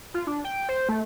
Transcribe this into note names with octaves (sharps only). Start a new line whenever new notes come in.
F4
D4
G5
C5
A3